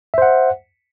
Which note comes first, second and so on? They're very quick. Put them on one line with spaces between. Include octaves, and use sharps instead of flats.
E5 C5 F#5